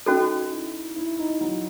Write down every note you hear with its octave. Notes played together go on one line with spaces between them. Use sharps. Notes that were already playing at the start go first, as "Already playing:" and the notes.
C#4 D#4 F#4 A4
E4
E4
D#4
F#3